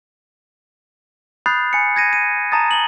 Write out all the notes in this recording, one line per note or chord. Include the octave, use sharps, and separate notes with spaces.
B5 D#6 F#6 G6 A6 C7
G#5 C#7
G#6 A#6 D#7
D#7
A5 A#5 D#6 A6
F#7 G7